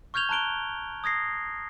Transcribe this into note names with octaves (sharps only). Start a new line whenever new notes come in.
C#6 F6 G6 G#6 F7 G7
A5 A#5 F#6 D7 G7
D#6 G#6 A#6 C7